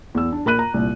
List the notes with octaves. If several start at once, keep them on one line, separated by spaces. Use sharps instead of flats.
E2 E6
D4
A#1 A#4 B5 F#6 D#7
A#5
C2 A#2